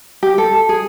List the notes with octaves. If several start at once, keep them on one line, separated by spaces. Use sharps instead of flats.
G4
A4
G#4